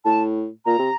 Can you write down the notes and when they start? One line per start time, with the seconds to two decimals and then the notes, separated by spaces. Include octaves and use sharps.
0.05 A2 A5
0.66 A#2 A#5
0.78 C3